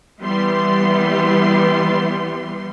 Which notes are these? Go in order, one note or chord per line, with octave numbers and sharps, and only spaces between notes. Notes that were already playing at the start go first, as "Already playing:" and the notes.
E3 G3 B3 C6